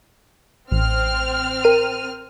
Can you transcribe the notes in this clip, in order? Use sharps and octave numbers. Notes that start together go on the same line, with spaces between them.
A1 C4 F6
A#4 D#7